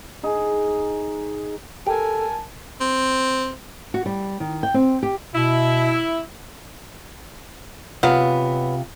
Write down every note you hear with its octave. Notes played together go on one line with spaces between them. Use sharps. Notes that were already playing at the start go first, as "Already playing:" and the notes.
D#4 G#4
G4 A4 A#4 G#5 A5
C4
F#4
G3
D#3
G5
C4
G4
B2 E4
C3 F#3 B3 F4 F5